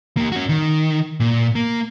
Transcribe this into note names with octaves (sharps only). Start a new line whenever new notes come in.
A#3 G4
C#4 F#4
D#3
A#2
A#3